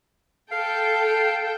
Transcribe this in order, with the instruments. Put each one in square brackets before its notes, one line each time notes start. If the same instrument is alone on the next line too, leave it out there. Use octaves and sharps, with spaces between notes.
[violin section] A4 G5 [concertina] F5